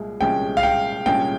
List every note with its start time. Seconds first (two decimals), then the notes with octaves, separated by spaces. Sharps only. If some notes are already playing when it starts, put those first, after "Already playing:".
Already playing: C2 A#2 G#3
0.21 C2 A#2 G#3 C#4 G5
0.57 F5
0.63 G5
1.06 C2 A#2 G#3 C#4 G5